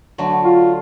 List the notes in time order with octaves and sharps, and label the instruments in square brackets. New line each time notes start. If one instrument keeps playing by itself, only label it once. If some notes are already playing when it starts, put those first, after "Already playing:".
[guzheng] D3 F#3 A3
[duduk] F4